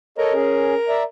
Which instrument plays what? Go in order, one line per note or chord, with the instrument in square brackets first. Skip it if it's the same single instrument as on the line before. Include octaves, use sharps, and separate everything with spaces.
[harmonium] A4 C#5 D#5 [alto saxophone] A#4
[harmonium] C#4 G#4
D5 E5 A#5